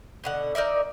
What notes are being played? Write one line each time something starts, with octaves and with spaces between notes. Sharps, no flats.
B2 D3 F#5
D#4 A#4 D5 E5